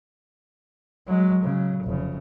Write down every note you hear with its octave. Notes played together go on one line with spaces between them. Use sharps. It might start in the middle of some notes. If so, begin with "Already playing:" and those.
F#3 G#3
C#3 F#3
F1 C#3